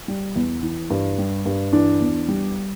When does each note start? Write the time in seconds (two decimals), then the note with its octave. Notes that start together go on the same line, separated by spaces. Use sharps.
0.08 G3
0.36 E2
0.63 E3
0.90 G2
1.18 G3
1.46 G2
1.73 E3 D4
2.01 E2
2.29 G3